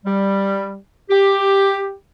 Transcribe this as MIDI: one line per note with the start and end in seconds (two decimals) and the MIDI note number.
0.06 0.77 55
1.10 1.93 67